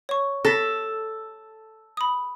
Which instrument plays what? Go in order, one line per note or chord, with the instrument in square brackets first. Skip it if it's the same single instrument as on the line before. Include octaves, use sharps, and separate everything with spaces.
[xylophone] C#5 C#6
[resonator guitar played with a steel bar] A4 [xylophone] A#6 B6
[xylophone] B5 D#6